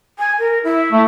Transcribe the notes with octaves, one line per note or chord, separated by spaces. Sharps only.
G#5
A#4
E4
A3